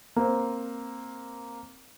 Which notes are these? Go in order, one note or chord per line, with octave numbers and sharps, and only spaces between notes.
A#3 C4